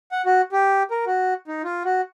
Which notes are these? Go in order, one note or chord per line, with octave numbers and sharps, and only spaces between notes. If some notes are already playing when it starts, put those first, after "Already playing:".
F#5
F#4
G4
A#4
F#4
D#4
F4
F#4